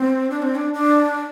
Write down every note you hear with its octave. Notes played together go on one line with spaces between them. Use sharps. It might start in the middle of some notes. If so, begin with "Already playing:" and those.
Already playing: C4
D4
C4
D4
D4